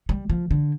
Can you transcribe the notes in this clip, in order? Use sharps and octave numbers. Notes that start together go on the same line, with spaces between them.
G3
F3
D3